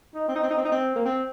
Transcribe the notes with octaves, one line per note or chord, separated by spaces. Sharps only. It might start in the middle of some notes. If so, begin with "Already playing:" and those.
D#4
C4
D#4
C4
D#4
C4
D#4
C4
A#3
C4